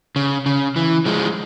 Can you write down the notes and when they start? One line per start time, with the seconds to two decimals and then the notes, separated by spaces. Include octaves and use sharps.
0.16 C#3
0.46 C#3
0.76 E3
1.06 F3 G#3